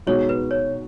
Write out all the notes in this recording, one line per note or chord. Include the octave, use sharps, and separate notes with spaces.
B2 G#3 D#4 F#4 C#5
B4
C#5